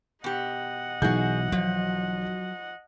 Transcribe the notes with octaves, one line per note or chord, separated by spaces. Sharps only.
B2 G4 D#5 F#5
B1 B2 E3 F#4 G#4 G6
F3 F#3